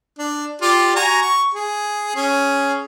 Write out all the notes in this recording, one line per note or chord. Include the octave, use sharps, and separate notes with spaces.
D4
F4 G4 D5
F#4 G#5 A#5
C#6
G#4
C#4 G#4